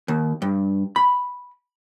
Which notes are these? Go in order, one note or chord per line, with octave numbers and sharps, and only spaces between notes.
D#2
G2
B5